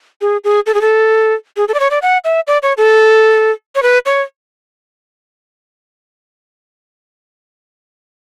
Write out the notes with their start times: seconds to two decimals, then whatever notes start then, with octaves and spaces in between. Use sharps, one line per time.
0.21 G#4
0.44 G#4
0.66 A4
0.74 G#4
0.81 A4
1.57 G#4
1.68 A4
1.74 D5
1.80 C#5
1.91 D5
2.02 F#5
2.24 E5
2.47 D5
2.63 C#5
2.77 A4
3.75 C#5
3.83 B4
4.06 C#5